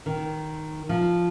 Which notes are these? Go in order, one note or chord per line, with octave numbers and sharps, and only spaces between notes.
D#3
F3